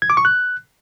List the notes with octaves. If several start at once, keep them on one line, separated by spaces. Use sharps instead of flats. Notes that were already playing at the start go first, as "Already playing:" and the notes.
G#6
D6
C#6
F#6